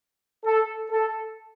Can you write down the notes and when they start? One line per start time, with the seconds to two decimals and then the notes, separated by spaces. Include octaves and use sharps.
0.44 A4
0.90 A4